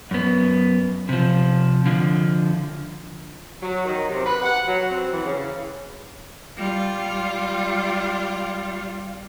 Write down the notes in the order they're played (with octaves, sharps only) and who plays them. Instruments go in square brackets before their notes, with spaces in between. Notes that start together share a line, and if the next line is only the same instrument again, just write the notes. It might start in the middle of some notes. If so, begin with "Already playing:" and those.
[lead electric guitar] F#2 B3
C3 F3
D3 F3
[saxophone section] F#3
D#3
C3
B4
F#5
F#3
C4
E3
C#3
[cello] G3 F4